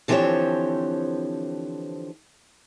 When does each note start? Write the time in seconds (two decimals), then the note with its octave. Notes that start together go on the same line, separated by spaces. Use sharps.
0.08 D3 E3 F3 C4 G4 C#5